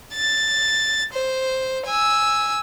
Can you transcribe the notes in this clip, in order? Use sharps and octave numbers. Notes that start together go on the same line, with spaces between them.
A6
C5
G#5 E6